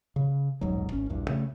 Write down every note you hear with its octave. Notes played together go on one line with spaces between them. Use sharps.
C#3
D#1 B1 G#2 F#3
G#1 C#4
A#1 E2 G2
C#3 A3